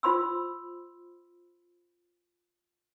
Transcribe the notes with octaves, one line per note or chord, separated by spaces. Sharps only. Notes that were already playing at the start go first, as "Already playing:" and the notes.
F4 C5 B5 C6 E6